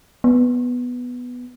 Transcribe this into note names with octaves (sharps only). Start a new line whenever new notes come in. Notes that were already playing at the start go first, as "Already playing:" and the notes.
B3